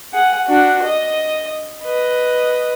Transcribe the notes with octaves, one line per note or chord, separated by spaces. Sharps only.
G#4 F#5
D4 F#4
D#5
B4 D#5